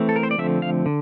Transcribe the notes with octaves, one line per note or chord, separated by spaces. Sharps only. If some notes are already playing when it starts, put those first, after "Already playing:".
Already playing: E3 A3 C4
A4
A#4
C5
D5
D3 F3 A3 C4 E5
F5
D3